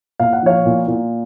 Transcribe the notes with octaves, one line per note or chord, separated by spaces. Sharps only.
A#2 F5
F#5
F3 C#5 F5
A#2
A#2